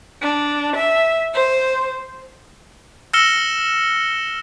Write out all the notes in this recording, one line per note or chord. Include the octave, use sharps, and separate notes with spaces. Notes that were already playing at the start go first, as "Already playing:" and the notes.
D4
E5
C5
E6 F6 A#6 C#7 E7 G7